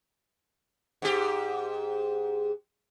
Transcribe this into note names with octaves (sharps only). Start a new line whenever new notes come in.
G#2 G4